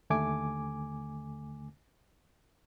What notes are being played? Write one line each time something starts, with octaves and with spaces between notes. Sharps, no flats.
D#2 D3 A3 G#5 D6